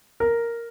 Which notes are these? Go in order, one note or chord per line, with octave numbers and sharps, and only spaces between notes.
A#4